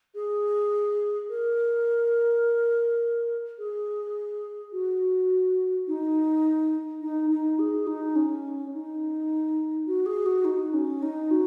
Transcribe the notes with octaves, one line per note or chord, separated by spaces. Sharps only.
G#4
A#4
G#4
F#4
D#4
D#4
D#4
G#4
D#4
C#4
D#4
F#4
G#4
F#4
D#4
C#4
D#4
F#4